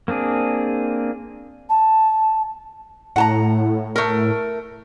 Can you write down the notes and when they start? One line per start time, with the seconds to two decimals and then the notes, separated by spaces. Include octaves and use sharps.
0.08 A#3 C4 D4 G#4
1.70 A5
3.16 A2 F#5 A5 A#5
3.96 A3 A#4